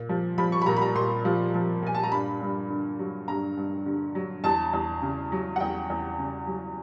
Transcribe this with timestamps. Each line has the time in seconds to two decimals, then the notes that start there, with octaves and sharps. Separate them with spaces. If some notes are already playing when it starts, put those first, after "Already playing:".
Already playing: A#2
0.09 F3
0.38 F3 B5
0.52 C#6
0.62 B5
0.66 A#2 A#5
0.77 B5
0.81 A#5
0.95 A#2 C6
1.25 F3
1.54 F3
1.82 A#2 G#5
1.95 A5
2.03 A#5
2.11 G2 B5
2.41 G2
2.69 D3
2.99 F#3
3.28 G2 A#5
3.57 G2
3.86 D3
4.15 F#3
4.44 E2 A5
4.73 E2
5.02 C#3
5.32 F#3
5.56 F#5
5.60 E2 G5
5.90 E2
6.19 C#3
6.47 F#3